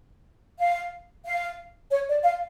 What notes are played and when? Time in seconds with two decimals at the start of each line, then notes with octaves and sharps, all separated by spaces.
0.59 F5
1.25 F5
1.91 C#5
2.08 D5
2.24 F5